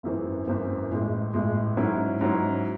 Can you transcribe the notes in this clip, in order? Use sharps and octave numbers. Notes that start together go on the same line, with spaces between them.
G#1 F#2 E3 C4
G#1 F#2 E3 C4
A1 A2 G#3
A1 A2 G#3
G#2 F#3 C#4 E4
G#2 F#3 C#4 E4